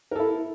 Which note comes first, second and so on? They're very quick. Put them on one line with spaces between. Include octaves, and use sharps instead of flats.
A#4 A4 E4